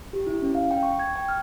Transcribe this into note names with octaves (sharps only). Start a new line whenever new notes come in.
G4
E4
C#4
F5
G5
C#6
G#6
G5
F6